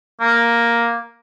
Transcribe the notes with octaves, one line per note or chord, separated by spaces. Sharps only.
A#3